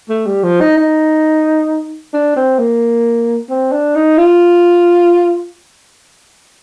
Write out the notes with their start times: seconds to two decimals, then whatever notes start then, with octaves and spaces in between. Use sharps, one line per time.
0.10 A3
0.27 G3
0.44 F3
0.61 D#4
0.78 D#4
2.14 D4
2.36 C4
2.59 A#3
3.50 C4
3.72 D4
3.96 D#4
4.18 F4